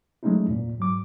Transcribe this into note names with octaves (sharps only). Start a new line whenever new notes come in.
F#3 G#3 A3 C#4 D#4 E4
F2 A#2
G#2 F#3 D6